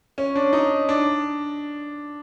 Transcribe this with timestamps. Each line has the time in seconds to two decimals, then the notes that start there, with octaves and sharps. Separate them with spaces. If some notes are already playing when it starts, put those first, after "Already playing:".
0.18 C#4
0.35 D4
0.53 D#4
0.89 D4